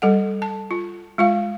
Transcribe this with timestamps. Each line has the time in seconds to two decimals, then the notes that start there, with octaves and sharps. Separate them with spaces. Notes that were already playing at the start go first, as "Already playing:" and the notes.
0.02 G3 A4 F#5
0.42 A5
0.71 F4
1.18 G#3 F4 F5